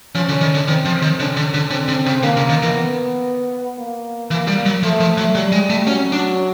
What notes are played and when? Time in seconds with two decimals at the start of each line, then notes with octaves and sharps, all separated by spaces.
0.15 F3 C#4
0.29 D3
0.41 D#3
0.55 D3
0.67 D#3 C4
0.85 F3
1.02 D#3
1.20 D3 C#4
1.37 D3
1.54 D3
1.71 D3 C4
1.89 D3
2.06 C#3
2.23 D3 A#3
2.37 C#3
2.49 D#3
2.63 E3
2.76 B3
3.79 A#3
4.31 E3
4.48 G3
4.66 F#3
4.83 F3 A3
5.00 F3
5.18 F#3
5.35 F#3 G3
5.52 G#3
5.70 A3
5.86 F#3 C#4
6.12 D4